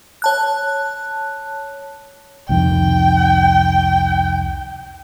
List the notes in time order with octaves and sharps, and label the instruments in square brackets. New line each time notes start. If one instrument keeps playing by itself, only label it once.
[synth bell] C#5 A5 F#6
[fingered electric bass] C2 F2 D#3 [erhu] G5